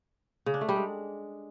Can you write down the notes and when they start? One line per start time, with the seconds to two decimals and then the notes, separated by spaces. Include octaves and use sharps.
0.46 C#3
0.54 D4
0.61 A3
0.69 G3
0.76 G#3